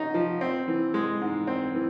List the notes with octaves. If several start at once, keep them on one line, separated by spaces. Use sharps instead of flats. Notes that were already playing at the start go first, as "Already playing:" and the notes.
Already playing: C#3 D#4
F3
C4
E3
G#3
G#2
C4
E3